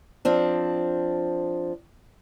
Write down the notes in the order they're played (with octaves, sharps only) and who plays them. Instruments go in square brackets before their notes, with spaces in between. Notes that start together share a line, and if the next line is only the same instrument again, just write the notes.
[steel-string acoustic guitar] F3 C4 D4